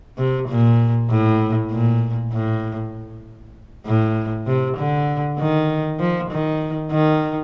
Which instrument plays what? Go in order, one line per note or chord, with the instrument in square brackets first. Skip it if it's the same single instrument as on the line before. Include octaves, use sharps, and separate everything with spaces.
[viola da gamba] C3
A#2
A2
A#2
A2
A2
C3
D3
D#3
F3
D#3
D#3